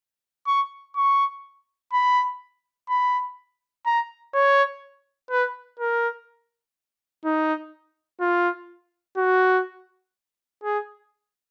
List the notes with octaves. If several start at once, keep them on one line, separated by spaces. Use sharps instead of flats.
C#6
C#6
B5
B5
A#5
C#5
B4
A#4
D#4
F4
F#4
G#4